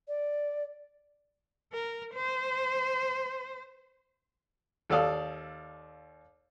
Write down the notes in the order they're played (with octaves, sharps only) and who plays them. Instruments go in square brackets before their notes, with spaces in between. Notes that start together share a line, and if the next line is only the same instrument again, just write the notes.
[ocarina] D5
[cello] A#4
C5
[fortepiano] D#2 A4 D5 F5 D#6